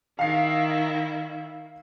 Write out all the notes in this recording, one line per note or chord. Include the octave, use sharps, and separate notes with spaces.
D#3 E4 F5 C7